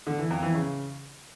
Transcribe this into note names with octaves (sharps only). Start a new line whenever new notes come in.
D3
E3
F2
E3
C#3